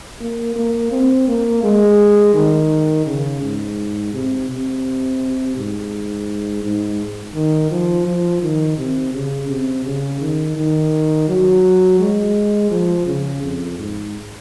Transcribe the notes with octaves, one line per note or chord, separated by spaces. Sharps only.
A#3
A#3
C4
A#3
G#3
D#3
C#3
G#2
C3
C3
G#2
G#2
D#3
F3
F3
D#3
C3
C#3
C3
C#3
D#3
D#3
F#3
G#3
F3
C#3
F2
G#2